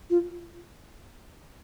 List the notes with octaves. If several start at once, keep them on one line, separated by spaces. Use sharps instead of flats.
F4